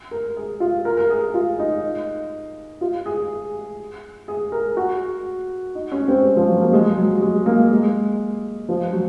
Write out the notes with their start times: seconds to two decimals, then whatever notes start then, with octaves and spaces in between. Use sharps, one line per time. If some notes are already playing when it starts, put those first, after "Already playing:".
0.11 A#4
0.37 G#4
0.60 F4
0.85 A#4
0.97 A#4
1.10 G#4
1.34 F4
1.59 D#4
2.81 F4
3.06 G#4
4.28 G#4
4.52 A#4
4.77 F#4
5.75 D#4
5.92 C#4
6.08 C4
6.23 G#3
6.37 F3
6.48 F#3
6.61 A#3
6.73 G#3
6.97 F#3
7.22 G#3
7.46 A#3
7.71 G#3
8.69 F3
8.93 F#3